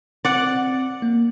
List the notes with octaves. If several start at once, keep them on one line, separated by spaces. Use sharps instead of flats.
C4 D5 F#5
A#3